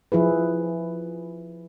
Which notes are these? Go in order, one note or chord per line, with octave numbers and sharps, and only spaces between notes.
F3 E4 G#4 B4